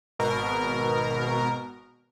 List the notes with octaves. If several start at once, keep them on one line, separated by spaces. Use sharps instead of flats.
G#1 B2 A#4